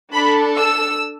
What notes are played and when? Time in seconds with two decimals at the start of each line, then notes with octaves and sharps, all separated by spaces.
0.12 D4 A4 B5
0.58 E6